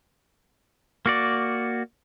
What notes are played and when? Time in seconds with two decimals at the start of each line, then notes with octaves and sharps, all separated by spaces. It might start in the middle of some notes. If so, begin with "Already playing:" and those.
1.06 A#3 F#4 D5